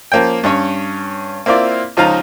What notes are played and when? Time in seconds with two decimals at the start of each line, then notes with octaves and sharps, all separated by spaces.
0.12 F3 A#3 C#4 G5
0.43 G2 C#4 C#5
1.46 A#3 C4 E4 F4 D5
1.97 C#2 F3 D#4 F5 A#5